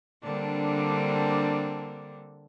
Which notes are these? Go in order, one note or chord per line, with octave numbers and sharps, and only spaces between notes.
D3 G3 A#3 C4 D4